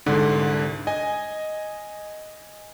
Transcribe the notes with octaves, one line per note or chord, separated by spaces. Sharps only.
C2 G#2 D3
D#5 G#5